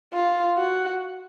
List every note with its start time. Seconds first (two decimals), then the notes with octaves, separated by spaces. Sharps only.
0.13 F4
0.57 F#4